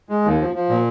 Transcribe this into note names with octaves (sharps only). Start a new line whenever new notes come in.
G#3
D#2
F3
F3
A#2